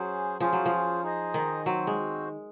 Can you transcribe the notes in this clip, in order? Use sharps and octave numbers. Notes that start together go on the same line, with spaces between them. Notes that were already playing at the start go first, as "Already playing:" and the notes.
Already playing: F#3 C#4 G#4 C5
F3 C#4 F4 G#4 C5
F#3
F3
D#4 G#4 C5 D#5
D#3
F#3 C4 F#4 C5
G#3